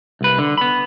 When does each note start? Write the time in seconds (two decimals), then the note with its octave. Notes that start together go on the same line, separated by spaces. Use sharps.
0.21 C2 B4
0.39 D3
0.57 B3 B5